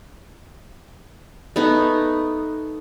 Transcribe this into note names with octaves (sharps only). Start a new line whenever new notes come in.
A3 B3 D#4